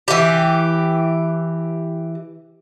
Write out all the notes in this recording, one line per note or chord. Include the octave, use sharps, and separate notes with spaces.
E3 G4